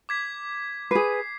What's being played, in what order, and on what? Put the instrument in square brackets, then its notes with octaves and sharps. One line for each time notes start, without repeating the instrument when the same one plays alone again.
[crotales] D6 G#6 B6
[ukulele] G#4 B4 [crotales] C7